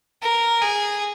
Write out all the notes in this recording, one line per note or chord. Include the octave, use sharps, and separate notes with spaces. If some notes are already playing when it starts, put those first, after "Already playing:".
A#4
G#4